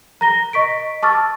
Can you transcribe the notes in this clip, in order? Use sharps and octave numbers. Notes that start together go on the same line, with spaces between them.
A#5 A#6 G7
D#5 C#6 B6 D7
A5 C#6 D6 E6 F6 A6